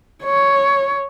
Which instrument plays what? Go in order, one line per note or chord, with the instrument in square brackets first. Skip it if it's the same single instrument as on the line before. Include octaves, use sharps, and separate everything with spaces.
[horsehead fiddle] C#5